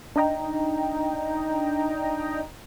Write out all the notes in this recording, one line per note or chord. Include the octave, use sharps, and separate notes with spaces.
D4 D#4 D#5 G5 A#5